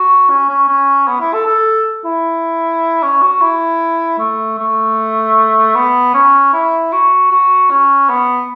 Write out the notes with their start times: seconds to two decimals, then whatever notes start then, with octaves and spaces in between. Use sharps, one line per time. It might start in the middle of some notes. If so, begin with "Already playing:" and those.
Already playing: F#4
0.30 C#4
0.49 C#4
0.69 C#4
1.08 B3
1.21 E4
1.34 A4
1.46 A4
2.05 E4
3.03 C#4
3.22 F#4
3.41 E4
4.19 A3
4.59 A3
5.75 B3
6.14 C#4
6.54 E4
6.93 F#4
7.31 F#4
7.71 C#4
8.10 B3